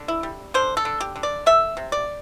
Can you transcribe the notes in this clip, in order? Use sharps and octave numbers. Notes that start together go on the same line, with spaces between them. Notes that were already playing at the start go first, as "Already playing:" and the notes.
Already playing: D3
E4
G3
D3 C5
A4
D3
G4
D3
D5
A3 E5
C3
D5